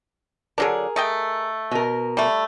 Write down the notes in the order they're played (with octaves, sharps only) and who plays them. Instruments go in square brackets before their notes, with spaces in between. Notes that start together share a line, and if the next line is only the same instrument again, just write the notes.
[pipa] D3 F#3 D4 [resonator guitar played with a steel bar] G#4 A#4
[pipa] A3 D#5 G5
[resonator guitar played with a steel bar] B2 A#4
[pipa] G3 A3